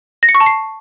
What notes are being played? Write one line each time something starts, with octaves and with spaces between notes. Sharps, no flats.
A#6
C#7
C#6
A5
C7